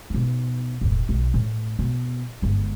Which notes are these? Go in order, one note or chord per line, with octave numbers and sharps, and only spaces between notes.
B2 D#4
E1 A2
B1
A2
B2
G1 G#3